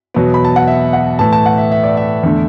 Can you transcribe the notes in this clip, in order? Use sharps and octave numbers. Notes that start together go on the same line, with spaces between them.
E2 B2 F#3 B3
B5
A5
F#5
E5
F#5
A2 E3 A3 A5
A5
F#5
E5
E5
D5
E5
E2 D3 A3